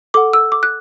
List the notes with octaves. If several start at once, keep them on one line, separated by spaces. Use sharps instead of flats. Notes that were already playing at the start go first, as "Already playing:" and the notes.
A4 F#5 D6
E6
D6
F#6